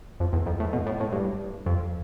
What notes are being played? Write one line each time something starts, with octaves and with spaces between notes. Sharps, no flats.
F2
E2
F2
A2
B2
A2
A2
G2
F2